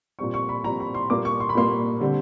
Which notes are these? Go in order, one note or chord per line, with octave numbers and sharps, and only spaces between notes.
A#2 G3 C4 C#6
C#6
B5
A#2 G3 C4 A#5
B5
C6
A#2 G3 A#3 D6
C#6
C6
B5
A#2 G3 A#3 C6
D3 G3 C4